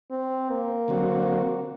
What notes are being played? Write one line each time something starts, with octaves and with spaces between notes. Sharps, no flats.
C4
A#3
D3 F#3 C4 F#4